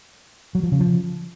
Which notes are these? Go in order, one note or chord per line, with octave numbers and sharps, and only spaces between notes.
F#3
F3
C#3
F3